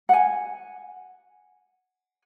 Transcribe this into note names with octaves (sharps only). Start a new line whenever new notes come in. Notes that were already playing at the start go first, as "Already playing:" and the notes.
F#5 G#5